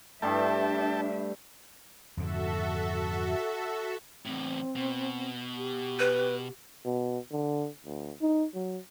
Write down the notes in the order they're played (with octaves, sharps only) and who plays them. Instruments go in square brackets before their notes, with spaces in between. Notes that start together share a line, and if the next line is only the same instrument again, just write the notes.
[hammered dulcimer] G2 G3 A3 [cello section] D4 E5 [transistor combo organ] A4 G5 A5
[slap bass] F2 G#2 D3 [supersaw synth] F#4 A4 E5
[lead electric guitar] E2 A2 [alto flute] C4
[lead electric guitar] B2
[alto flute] G4
[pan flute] B4
[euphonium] B2
D3
D2
D#4
F#3